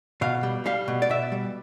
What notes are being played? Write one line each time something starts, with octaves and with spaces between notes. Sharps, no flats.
B2 F5
G3
G3 F5
B2
D5
B2 E5
G3